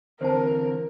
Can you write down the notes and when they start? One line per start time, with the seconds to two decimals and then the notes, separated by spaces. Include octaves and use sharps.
0.21 D3 E3 C4 A#4 C5 A5